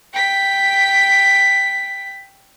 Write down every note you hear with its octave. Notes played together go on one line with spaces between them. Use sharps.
G5 B6